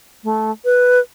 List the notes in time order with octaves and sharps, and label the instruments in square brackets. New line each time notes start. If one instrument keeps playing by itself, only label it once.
[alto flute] A3
B4